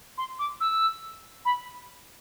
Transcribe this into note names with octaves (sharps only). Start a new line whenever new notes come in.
C6
D6
E6
B5